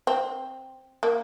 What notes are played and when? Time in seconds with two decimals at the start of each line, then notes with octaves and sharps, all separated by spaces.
0.07 C4
1.03 A#3